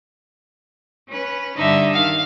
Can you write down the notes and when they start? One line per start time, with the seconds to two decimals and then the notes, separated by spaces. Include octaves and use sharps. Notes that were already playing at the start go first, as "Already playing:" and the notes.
1.09 C#4 B4
1.57 G2 D3 D#4 E5
1.94 D#3 F5